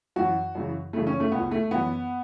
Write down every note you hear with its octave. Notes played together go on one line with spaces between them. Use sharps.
F#2 E3 F#4
F#2 C#3 E3
F#2 C#3 E3 A3
C#4
A3
C#2 B2 B3
A3
F#2 E3 B3